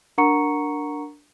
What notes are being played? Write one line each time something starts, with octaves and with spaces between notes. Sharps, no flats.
D4 A#4 F#5 A#5 C#6 C#7